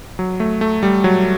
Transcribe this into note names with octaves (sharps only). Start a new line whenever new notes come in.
F#3
A3
A3
G3
F#3